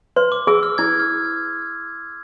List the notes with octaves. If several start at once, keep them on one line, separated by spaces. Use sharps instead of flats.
B4 C6
D6
G#4 E6
F6
E4 G#6
F6